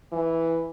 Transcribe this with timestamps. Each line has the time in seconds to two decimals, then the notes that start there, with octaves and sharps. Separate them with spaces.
0.12 E3